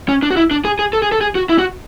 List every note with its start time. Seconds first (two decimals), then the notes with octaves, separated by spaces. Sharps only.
0.09 C#4
0.23 D4
0.31 F#4
0.37 E4
0.51 D4
0.65 G#4
0.79 G#4
0.93 A4
1.02 G#4
1.12 A4
1.21 G#4
1.35 F#4
1.49 E4
1.59 F#4